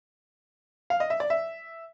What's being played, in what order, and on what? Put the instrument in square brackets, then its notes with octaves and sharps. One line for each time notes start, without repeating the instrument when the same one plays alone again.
[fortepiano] F5
D#5
E5
D5
E5